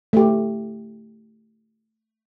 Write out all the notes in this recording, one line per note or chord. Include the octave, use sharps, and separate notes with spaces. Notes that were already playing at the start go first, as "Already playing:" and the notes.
A3 G4